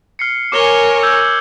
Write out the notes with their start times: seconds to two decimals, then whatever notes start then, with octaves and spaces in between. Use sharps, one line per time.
0.19 F6 C7 C#7
0.52 A#4 C#5 G#5 D6 G7
1.03 E6 G6 G#6